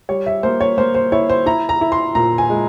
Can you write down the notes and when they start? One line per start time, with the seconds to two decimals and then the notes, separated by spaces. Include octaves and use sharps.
0.09 G3 C#5
0.26 E5
0.43 A#3 C5
0.61 C#5
0.78 A#3 C5
0.95 C5
1.12 E4 C#5
1.30 C5
1.46 E4 A#5
1.69 A#5
1.81 E4
1.92 C6
2.15 A#2 A#5
2.38 G#5
2.50 G#3